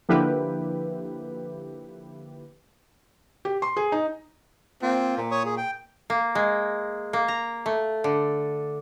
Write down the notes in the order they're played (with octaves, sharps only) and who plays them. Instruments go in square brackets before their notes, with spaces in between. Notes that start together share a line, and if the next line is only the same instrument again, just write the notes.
[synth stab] D3 F3 A#3 E4 G4 B4
[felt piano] G4
C6
G#4
D#4
[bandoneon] A#3 F4 [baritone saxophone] C4
[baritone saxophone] A#2
[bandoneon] C#5 C#6 D#6
G#4
G5
[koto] A#3
G#3
A#3
A#5
A3
D3